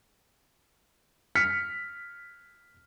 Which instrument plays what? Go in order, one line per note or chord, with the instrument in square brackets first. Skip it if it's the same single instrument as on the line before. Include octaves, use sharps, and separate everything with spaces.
[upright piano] F6 B6 C#7